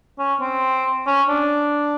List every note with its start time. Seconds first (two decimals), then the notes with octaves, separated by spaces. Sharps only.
0.18 C#4
0.40 C4
1.06 C#4
1.28 D4